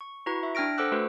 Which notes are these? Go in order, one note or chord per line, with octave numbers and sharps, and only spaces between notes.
C#6
E4 F#4 B4 A#5 C#6
E5
D4 G5 F6 A#6 D7
A4 C5 F#5 D6 E6 F#6
A3 F#4 A4 B4 C5